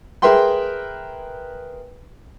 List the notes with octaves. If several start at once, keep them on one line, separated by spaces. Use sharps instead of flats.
G#4 A#4 B4 E5 G5 C6